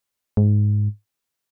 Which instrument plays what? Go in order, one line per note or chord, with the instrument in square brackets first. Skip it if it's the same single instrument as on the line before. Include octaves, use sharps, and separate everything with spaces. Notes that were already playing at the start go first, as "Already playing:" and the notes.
[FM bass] G#2